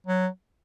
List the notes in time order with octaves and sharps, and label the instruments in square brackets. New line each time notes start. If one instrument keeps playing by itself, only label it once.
[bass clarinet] F#3